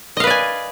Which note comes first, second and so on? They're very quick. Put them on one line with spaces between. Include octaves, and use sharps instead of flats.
D#5 F5 B4 D5 G#5